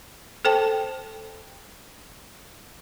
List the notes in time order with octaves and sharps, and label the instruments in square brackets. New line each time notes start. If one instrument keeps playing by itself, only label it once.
[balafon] A4 C5 G5 A5